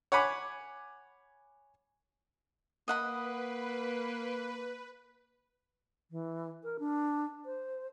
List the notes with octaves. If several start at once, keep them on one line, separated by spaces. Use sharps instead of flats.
C#5 F#5 G#5 B5 D6
A#3 B4 D#5 F#5 B5
E3
A#4
D4
C5